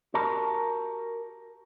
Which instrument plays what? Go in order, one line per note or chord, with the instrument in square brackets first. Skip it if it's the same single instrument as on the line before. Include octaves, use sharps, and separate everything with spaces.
[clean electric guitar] F#4 G4 A#4 A5